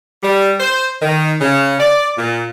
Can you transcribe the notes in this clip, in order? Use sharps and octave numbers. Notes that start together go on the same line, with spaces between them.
G3
C5
D#3
C#3
D5
A#2